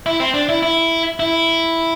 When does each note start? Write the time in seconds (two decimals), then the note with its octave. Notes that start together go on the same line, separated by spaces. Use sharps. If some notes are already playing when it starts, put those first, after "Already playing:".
0.06 E4
0.20 C4
0.34 D4
0.49 E4
0.63 E4
1.20 E4